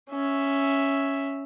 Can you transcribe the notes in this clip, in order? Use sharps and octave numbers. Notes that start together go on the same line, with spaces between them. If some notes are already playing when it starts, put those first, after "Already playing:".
C#4 E5